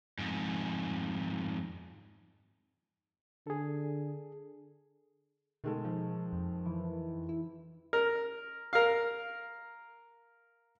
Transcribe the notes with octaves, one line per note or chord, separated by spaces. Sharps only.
F2 G#2
D3 G#4 A4
B2 D#3 G#3 A4
F3
F2
E3
E4
A#4
A#4 F5